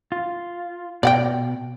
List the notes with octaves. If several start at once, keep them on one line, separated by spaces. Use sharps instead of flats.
F4
B2 D5 F#5 G5